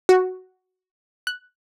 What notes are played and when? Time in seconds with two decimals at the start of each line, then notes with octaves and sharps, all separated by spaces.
0.09 F#4
1.27 F#6